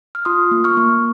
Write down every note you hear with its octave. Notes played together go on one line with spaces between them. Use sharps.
F6
F4 C6 D#6
A#3
C#6 F6
A#3